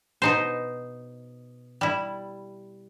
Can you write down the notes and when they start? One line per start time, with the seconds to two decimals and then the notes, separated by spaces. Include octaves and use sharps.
0.22 B2 D#4 C5
1.81 G3 E4